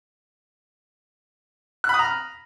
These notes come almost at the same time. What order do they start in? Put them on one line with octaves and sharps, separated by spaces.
F#6 B5 D#6 A#5 F6